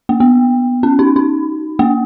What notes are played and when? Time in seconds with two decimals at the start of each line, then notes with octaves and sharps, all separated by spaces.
0.09 A#3
0.20 B3
0.83 C#4
0.99 D#4
1.16 D#4
1.79 A#3